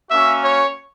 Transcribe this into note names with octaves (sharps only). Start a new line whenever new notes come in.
A#3 C#4 F#4 E5
C#5